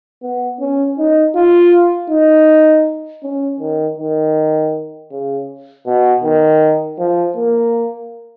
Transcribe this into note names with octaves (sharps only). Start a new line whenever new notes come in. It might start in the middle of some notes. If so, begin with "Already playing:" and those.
B3
C#4
D#4
F4
D#4
C#4
D#3
D#3
C#3
B2
D#3
F3
A#3